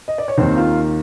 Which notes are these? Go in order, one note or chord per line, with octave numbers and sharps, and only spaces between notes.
D#5
D5
C#5
D#2 D#3 C4 C5
F4 F5